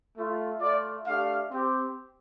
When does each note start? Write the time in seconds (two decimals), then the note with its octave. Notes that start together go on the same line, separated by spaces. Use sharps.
0.16 A3 F4
0.60 A3 F4 D5
1.05 A3 D4 G4 F5
1.49 C4 G4